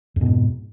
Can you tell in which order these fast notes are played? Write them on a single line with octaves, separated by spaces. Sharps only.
F2 B2 G#2